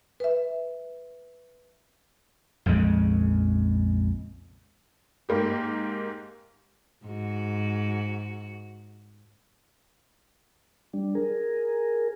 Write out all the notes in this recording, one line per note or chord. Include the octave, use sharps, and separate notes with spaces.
B4 E5
A#1 F2 C#3 G#3
G#2 A#3 G4
G#2 F#4
G3 D4
G#4 A#4